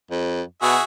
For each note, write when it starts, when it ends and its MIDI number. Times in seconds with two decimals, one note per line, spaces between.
0.11 0.42 41
0.62 0.76 47
0.62 0.84 66
0.62 0.84 68
0.62 0.84 76